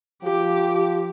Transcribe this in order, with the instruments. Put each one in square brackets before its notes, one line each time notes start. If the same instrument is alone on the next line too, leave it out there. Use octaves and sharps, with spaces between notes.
[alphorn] F3 [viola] G4